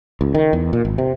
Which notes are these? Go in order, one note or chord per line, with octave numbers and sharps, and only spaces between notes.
C#2
D#3
E2
A#2
G#1
C3